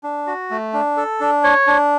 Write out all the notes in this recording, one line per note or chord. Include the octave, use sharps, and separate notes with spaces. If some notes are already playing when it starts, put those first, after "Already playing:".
D4
F#4
A3
D4
A4
D4
C#5
D4